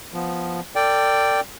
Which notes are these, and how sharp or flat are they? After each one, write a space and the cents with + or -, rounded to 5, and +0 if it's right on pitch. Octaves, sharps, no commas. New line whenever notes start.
F3 +0 B3 +0
A4 +45 D5 +0 G5 +0